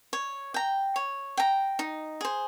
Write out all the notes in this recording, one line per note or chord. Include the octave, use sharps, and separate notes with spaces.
C#5
G5 A#5
C#5
G5 A#5
D#4
G#4 C5